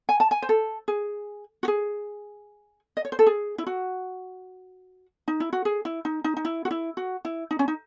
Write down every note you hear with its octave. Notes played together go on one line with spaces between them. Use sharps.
G#5
A5
G#5
C5
A4
G#4
F#4
G#4
D#5
C#5
C5
A4
G#4
E4
F#4
D#4
E4
F#4
G#4
E4
D#4
D#4
D#4
E4
F#4
E4
F#4
E4
D#4
C#4
D#4